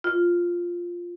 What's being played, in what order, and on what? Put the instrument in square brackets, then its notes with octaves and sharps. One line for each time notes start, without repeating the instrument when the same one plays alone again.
[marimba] F4